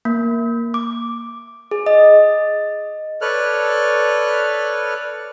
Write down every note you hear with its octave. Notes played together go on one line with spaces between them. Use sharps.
A#3
D6
G#4
D#5
A4 B4 C#5 D5 F6 F#6